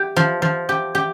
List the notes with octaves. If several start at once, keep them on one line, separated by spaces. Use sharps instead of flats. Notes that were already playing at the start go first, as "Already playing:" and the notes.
Already playing: G4
F3
F3
G4
G4